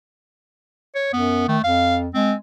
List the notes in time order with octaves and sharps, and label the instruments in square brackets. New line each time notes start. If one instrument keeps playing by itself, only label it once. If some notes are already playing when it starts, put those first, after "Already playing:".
[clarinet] C#5
[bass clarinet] F#2 [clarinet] B3
[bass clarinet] D#3 [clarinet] A3
[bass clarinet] F2 [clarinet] F5
[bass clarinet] G#3 [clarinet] C4